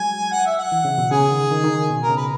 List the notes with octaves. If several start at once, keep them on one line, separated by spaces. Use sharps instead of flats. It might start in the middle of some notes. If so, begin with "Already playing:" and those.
Already playing: F#3 G#3 G#5
F#5
E5
F#5
E3
C#3
B2
C#3 G#4
D#3
D#3
D#3
B2
A#4
C#3
B4